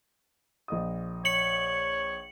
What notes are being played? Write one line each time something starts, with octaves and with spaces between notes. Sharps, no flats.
A#1 D#5 D#6
C#5 C#7 F#7